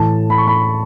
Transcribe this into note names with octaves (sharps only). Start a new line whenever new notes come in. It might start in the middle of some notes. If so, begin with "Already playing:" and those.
Already playing: A2 E3 A5
B5
C#6
B5